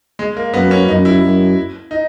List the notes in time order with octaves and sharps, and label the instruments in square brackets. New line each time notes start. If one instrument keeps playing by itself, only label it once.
[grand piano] G#3
A#3
[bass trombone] F#2 [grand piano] B3
[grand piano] C#4
[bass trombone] F#2 [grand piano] D#4
[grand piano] E4
[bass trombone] F#2
[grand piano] D#4